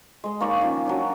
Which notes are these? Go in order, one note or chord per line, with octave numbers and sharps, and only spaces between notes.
G#3 D#5
A#3 D#4 C#5 D5
D#3 F3 C#4
F#3 C#4 D4